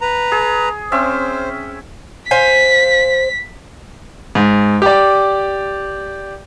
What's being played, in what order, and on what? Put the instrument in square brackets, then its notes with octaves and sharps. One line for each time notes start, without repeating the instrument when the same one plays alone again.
[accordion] B4 A#5
[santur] G#4
[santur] C4 C#4 E5 [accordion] C5
[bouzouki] C5 F5 G#5 [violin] B6
[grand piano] G#2
G4 D5